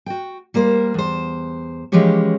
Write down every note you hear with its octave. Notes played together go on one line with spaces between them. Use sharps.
F#4 G5
G3 A#3 A#4 C5
E2 C5
E3 F3 G#3 C#4 G4 C#5